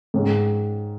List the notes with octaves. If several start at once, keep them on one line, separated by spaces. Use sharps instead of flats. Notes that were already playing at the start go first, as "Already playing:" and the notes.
G#2 D#3 G#3 C#4